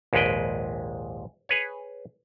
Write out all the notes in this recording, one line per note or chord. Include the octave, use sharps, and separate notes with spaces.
A#1 D#2 G#2 G#3 B4 G5
G#4 B4 C#5